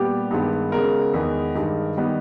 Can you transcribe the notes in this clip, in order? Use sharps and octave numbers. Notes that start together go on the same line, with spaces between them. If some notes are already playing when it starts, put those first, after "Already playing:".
Already playing: A#2 G3 B3 G4
G2 D#3 G#3 B3
C#3 G#3 B3 A#4
E2 D#3 G#3 B3
G2 D#3 G#3
D#3 G3 B3